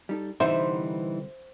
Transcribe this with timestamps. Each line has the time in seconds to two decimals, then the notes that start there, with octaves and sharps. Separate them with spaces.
0.09 G3 D#4 A4
0.40 C2 D3 E3 G3 D#4 C5 E5 F#5